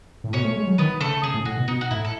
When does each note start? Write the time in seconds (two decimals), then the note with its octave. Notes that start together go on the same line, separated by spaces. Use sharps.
0.24 A2
0.33 B2 C#4 C#5
0.45 A3
0.56 G#3
0.67 F#3
0.78 D#3 B3 B4
1.01 C#3 A3 A4
1.23 C#3 G#4
1.34 A2
1.45 A2 F#4
1.57 B2
1.68 B2 D#4
1.81 F#4
1.91 A2 E4
2.05 A4